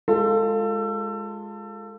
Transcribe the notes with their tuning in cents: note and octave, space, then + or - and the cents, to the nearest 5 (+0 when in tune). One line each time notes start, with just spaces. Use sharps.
G#3 +0 F4 +0 A4 +25